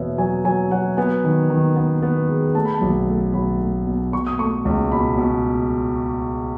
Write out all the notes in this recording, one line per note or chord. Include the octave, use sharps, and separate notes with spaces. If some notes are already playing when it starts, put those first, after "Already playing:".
Already playing: E2 B2 B3 C#5 E5
F#3 G#5
F#3 G#5
F#3 F#5
B3 G#5
D#3
D#3
B3
B3
G#3
A3 A5
B5
A5
B1
A3
B1 B5
A3
B2
B2 C#6
D#6
A3 C#6
C#2
B2 B5
B2